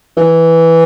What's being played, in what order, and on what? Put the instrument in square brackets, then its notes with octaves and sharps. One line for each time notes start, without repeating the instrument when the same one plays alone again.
[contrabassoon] E3